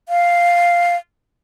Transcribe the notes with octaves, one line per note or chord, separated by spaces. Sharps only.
F5